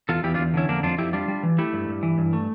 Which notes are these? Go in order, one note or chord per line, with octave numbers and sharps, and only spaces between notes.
E2 F4 A4
E2 E4 G4
D4 F4
E2
D3 C#4 E4
F2 A#3 D4
F2 D4 F4
F2 E4 G4
G3 D4 F4
G3
E3
A3 E4 G4
G2
G2
E3
G2
A3